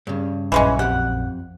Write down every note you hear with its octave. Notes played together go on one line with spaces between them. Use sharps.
G2 C#3
A#1 F#2 E3 G#3 C#4
F2 G4 F#5